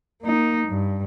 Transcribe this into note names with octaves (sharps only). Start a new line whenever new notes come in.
A#3 D#4
G2